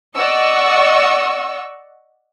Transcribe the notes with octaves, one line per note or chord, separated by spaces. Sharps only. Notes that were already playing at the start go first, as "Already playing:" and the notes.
D5 D#5 F#5 C#6 E6